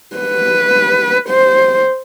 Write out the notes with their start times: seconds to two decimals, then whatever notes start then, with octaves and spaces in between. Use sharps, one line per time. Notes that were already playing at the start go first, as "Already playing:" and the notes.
0.16 B4
1.29 C5